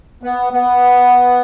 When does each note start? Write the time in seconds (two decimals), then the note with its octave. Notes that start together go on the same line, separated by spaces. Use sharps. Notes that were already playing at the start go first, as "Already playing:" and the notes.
0.23 B3
0.53 B3